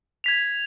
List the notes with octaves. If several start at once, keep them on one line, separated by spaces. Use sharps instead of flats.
G#6 B6 F7